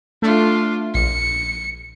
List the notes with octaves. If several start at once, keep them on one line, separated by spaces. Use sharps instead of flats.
A3 D4 F4
A#1 C#7